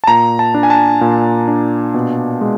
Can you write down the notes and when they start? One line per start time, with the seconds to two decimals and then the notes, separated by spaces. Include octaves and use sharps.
0.04 A5
0.07 A#2 A#5
0.39 A5
0.54 D4
0.63 G#5
0.70 A5
1.01 A#2
1.48 D4
1.94 B2
2.41 G#3